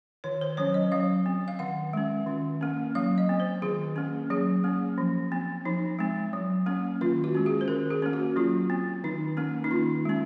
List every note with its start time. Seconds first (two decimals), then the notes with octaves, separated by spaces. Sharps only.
0.24 D#3 C#5
0.41 C5
0.57 F#3 C#4 C#5
0.74 D#5
0.92 F#3 F5
1.26 C4
1.48 F5
1.59 D#3 F#5
1.93 G#3 C#4
2.27 D#3
2.61 A#3 C#4
2.95 F#3 F5
3.18 D#5
3.29 C4
3.40 C5
3.62 D#3 G#4
3.96 A#3 C#4
4.30 F#3 G#4
4.64 A#3 C#4
4.98 F3
5.32 C4
5.65 F3 D#4
5.99 G#3 C4
6.33 F#3
6.66 A#3 C#4
7.01 D#3 F4
7.24 F#4
7.35 G#3 C#4
7.46 G#4
7.61 C5
7.68 D#3 A#4
7.91 G#4
8.02 A#3 C#4
8.13 F#4
8.36 F#3 F4
8.70 C4
9.04 D#3 D#4
9.37 A#3 C#4
9.64 D#4
9.71 D#3 F4
10.05 G#3 C#4